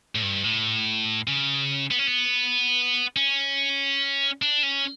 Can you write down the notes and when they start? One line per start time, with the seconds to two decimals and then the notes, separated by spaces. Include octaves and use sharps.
0.15 A2
0.22 G2
0.44 A2
1.28 C#3
1.91 B3
1.99 C#4
2.07 B3
3.16 C#4
4.42 D4
4.63 C#4